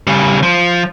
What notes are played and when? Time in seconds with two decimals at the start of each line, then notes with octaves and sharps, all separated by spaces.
0.07 C#3 G3
0.43 F3